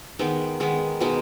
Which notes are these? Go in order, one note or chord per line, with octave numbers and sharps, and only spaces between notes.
D#3 G#3 B3 D#4
D#3 G#3 B3
B2 G#3 B3 D#4